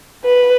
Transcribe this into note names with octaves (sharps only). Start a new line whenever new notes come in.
B4